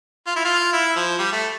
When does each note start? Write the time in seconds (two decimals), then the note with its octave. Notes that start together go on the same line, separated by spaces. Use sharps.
0.27 F4
0.36 E4
0.45 F4
0.73 E4
0.96 F3
1.19 G3
1.32 A3